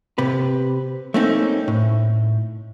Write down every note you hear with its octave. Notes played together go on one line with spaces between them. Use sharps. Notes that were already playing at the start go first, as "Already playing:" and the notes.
C3 B4
A3 A#3 C4 C#4 D#4
A2